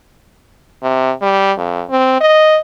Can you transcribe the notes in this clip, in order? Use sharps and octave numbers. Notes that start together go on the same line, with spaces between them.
C3
G3
F2
C4
D#5